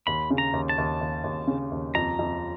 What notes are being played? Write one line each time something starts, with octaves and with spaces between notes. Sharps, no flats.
D#2 B5
C#3
A#5
D#2
A5
D#2
D#2
D#2
C#3
D#2
F2 A#5
F2